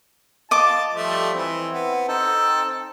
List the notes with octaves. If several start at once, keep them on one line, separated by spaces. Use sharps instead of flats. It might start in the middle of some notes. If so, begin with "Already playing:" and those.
F4 D#5 A5 D6
F3 G3 A3 C5
E3 C4 E4
B3
C4 D#4 A4 G5